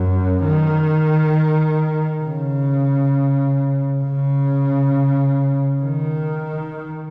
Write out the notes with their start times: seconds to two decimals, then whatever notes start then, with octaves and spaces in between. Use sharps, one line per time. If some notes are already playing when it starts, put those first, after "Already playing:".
Already playing: F#2
0.45 D#3
2.24 C#3
4.03 C#3
5.82 D#3